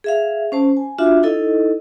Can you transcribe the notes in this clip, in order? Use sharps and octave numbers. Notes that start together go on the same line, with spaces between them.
G#4 E5 F5
C#4 C5 A5
G#5
D4 F4 F#4 E5 F5
D#4 E4 A4 D#5